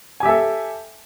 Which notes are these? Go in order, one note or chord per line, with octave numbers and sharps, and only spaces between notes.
G4 A4 E5 G#5